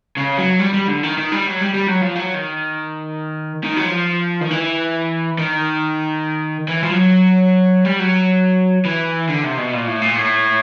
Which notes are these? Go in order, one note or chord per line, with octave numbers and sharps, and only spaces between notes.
C#3
F#3
G3
G3
D3
D#3
D#3
G3
F#3
G3
G3
F#3
F3
F#3
D#3
D#3
F#3
F3
D#3
E3
D#3
E3
F3
F#3
G3
F#3
E3
D3
C3
B2
A#2
A2
A#2
A2